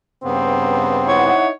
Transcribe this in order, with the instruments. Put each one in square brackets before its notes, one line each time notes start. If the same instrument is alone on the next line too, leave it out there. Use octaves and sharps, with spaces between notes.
[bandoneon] G2 C#3 B3 [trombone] C4
[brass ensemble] D#4 E4 F#5 [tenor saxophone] C#5